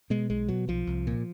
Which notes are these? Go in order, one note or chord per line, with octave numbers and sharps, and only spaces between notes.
B2 G#3
B1 G#3
B2 F#3
B1 F3
C2
A#2